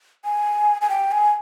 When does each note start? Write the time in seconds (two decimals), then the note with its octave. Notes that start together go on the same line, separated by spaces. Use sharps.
0.24 G#5
0.81 G#5
0.89 G5
1.11 G#5